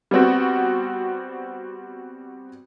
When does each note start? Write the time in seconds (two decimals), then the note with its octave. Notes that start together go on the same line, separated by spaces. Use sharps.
0.11 G3 B3 C4 F#4